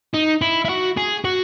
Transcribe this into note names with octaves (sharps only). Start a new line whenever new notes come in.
D#4
E4
E4
F#4
G#4
F#4